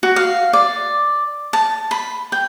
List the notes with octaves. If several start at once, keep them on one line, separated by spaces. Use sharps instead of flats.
F#4
F5
D5
A5
B5
G5